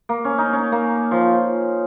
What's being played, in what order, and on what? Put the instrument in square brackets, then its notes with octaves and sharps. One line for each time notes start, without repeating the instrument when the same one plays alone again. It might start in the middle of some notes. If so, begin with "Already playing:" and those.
[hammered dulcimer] A#3
C#4
D#4
C#4
A#3
F3